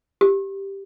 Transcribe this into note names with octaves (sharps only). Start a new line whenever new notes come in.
G4